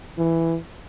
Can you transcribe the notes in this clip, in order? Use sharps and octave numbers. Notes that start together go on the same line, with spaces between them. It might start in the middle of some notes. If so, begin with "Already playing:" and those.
E3